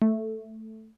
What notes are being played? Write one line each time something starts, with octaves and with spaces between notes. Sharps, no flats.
A3